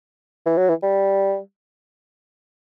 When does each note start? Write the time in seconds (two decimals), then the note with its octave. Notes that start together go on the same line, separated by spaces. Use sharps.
0.46 E3
0.57 F#3
0.69 E3
0.83 G3